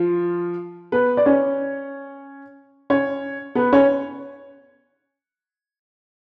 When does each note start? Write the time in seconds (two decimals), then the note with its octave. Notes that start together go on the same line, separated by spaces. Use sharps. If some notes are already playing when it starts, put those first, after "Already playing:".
Already playing: F3 F4
0.92 B3 B4
1.17 D5
1.26 C#4 C#5
2.90 C#4 C#5
3.55 B3 B4
3.72 C#4 C#5